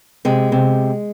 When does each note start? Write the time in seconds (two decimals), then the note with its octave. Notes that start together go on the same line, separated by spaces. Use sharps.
0.25 C3 G#3
0.52 C3